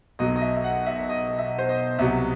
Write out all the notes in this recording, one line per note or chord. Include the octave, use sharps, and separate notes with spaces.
B1 B2 F#3 D#5
D#5
E5
E5
F#5
E5
E5
D#5
E5
C5
D#5
C2 B2 F#3 E5